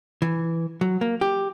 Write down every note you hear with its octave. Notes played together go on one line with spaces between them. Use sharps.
E3
F#3
A#3
G4